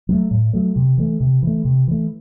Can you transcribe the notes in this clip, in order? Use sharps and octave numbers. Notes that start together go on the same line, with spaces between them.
F#3 A3
A2
F#3 A3
C3
E3 A3
C3
E3 A3
C3
E3 A3